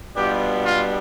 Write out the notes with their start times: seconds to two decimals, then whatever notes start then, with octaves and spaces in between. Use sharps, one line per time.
0.17 B2 G3 B3 D4 F4 G4
0.66 F4